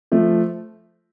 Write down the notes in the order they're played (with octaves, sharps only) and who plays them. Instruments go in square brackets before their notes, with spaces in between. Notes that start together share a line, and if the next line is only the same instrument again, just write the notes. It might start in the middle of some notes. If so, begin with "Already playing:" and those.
[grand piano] F3 A3